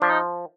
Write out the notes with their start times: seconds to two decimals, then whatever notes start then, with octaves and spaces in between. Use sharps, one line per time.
0.01 F3 D4
0.10 D#4